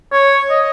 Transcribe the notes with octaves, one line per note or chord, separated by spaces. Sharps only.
C#5
D#5